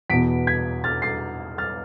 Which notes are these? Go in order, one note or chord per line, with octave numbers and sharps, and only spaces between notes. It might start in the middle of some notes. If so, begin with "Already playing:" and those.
E2 B2 B3 B6 D7
G#6 B6
F6 A6
A6 C7
F6 A6